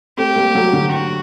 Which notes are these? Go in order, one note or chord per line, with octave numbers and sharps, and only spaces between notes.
A3 C4 G4
G3 A#3
F#3 A3
D3 F#3
F#4